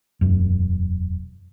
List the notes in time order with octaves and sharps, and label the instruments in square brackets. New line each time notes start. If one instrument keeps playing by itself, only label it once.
[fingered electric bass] E1 F#2